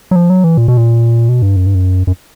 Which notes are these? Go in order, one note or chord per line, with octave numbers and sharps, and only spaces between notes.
F#3
F3
F#3
E3
A#2
B2
A#2
B2
G2
F#2
G2
F#2
F#2